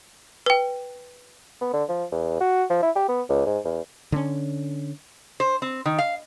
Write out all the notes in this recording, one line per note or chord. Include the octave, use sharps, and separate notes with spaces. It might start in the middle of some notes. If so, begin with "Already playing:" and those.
B4 G5
B3
D3
F3
E2
F#4
F3
E4
G4
B3
C#2
G#2
E2
D3 C4 C#4
C5
C4
D#3
F5